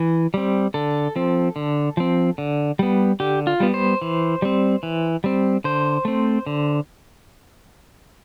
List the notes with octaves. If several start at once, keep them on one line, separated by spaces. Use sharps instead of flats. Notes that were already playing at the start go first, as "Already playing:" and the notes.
Already playing: E3
G3 C4
D3 A4
F3 C4
D3
F3 C4
D3
G3 B3
D3 G4
F4
G3 B3
C5
E3
G3 C4
E3
G3 C4
D3 C5
A3 C4
D3